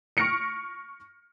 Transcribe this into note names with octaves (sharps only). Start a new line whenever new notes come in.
C#6 F6 A#6 C#7 D7